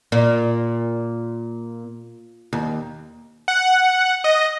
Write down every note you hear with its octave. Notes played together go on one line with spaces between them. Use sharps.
A#2
D#2
F#5
D#5